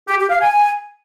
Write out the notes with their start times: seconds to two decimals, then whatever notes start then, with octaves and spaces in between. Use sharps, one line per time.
0.09 G4
0.19 G4
0.30 F5
0.41 G#5